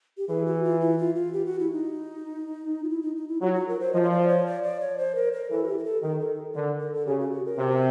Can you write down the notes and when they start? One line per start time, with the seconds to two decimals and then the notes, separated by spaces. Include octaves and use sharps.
0.18 G4
0.28 E3 G#4
0.46 F#4
0.63 F4
0.80 E4
0.98 F4
1.15 F4
1.33 G4
1.46 F#4
1.59 E4
1.72 D#4
2.84 F4
2.89 E4
3.02 D#4
3.16 D#4
3.28 E4
3.41 F#3 F4
3.55 F4
3.68 A#4
3.80 C5
3.93 F3 D#5
4.02 C#5
4.11 D5
4.28 C#5
4.46 D5
4.63 D5
4.80 C#5
4.98 C5
5.15 A#4
5.33 A#4
5.50 E3 A4
5.63 F#4
5.67 G4
5.79 A#4
5.84 A4
6.02 D#3 A#4
6.19 A4
6.55 D3 A#4
6.80 A#4
6.93 A4
7.07 C#3 G4
7.19 F#4
7.32 F#4
7.46 A#4
7.59 C3